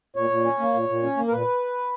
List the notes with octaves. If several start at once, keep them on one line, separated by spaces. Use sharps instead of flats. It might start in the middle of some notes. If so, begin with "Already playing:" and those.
A#2 C#5
A#2
C#4
A#3
A#2
A#2
C#4
A#3
A#4
A#2 B4